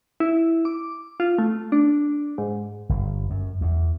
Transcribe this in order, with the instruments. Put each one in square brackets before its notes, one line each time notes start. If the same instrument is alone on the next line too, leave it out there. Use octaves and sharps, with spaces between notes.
[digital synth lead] E4
D6
F4
A3
D4
G#2
[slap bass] G1
F#2
E2